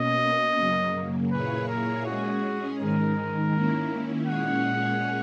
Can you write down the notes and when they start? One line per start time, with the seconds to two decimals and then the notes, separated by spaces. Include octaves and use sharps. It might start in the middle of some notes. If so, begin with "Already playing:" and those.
Already playing: B2 A#3 C#4 D#5
0.58 F#2 C#3 F#3 A#3
1.31 A#2 A#3 E4 G#4 B4 C#5
1.68 A#4
2.05 G#3 C#4 F#4 G#4
2.79 G#2 D#3 G#3 A#4
3.53 D#3 A#3 C#4 E4
4.26 A#2 G#3 C#4 G#4 C#5 F#5